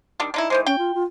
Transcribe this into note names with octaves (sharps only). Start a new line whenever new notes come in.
D#3 G3 D4
D3 D#4 E4
D#3 E3 G#3 C5
C#4 G5
F4
F4